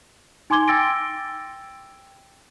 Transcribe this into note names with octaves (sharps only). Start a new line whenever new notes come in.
D#4 G#5 C6 D6 G#6 G7
G5 E6 A6 A#6 D7